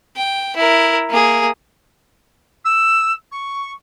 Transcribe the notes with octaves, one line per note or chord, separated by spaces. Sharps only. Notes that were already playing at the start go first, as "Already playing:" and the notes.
G5
E4 A#4
A#3 G#4
E6
C#6